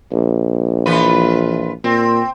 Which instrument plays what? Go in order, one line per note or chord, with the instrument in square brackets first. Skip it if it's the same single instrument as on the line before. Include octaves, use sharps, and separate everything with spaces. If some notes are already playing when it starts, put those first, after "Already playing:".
[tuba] A#1
[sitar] E3 F4 B4
[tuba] A#2 [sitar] C4